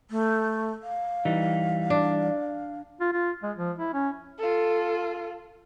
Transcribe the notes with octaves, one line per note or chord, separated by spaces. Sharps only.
A3
F5
E3 G3 D#4
D4
F4
F4
G#3
F3
E4
C#4
F4 A4